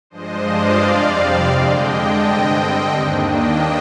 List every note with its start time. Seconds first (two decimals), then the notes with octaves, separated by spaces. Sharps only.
0.10 G2 F3 G#3 D4 C5 D#5
0.46 D5 F5
0.81 F2 C3 G3 C4
1.51 D3 G#3 D4 D#5 G5
1.86 D#5 G5
2.21 G2 D3 G3 C4
2.92 D#2 D#3 A#3 D4
3.27 D#5 G5